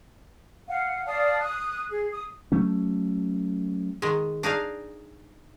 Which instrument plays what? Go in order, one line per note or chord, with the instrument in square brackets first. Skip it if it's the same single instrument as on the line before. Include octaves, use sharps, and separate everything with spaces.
[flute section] F5 F#5
D5 F5 A5 D#6
D#6 F#6
G#4
D#6
[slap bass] F#3 A3 C#4
[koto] D#3 G#3
D4 D#4 G#4 F5